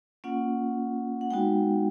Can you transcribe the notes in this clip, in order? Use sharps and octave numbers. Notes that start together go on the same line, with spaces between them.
A#3 C#4 F4 F#5
F#5
G#3 B3 D#4 F#4 G5